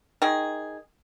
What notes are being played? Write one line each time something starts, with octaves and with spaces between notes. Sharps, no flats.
D#3 G#4